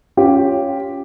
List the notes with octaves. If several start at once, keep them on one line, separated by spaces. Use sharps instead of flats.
C#4 F4 G4